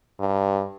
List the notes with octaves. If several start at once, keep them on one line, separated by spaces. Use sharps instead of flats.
G2